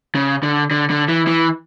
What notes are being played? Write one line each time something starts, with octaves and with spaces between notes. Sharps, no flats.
C#3
D3
D3
D3
E3
E3